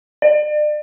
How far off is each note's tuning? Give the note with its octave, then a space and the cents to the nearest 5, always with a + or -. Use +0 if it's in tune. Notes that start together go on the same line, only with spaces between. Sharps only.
D5 +40